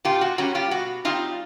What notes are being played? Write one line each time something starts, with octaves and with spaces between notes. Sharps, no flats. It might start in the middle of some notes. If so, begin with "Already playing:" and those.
A#2 F4 G4
F#4
G3 A#3 C#4 F#4
F4 G4
B2 F#4
G3 C4 D#4 F4